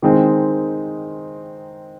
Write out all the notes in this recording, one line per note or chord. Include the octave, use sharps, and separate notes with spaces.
D#3 G#3 C4 D#4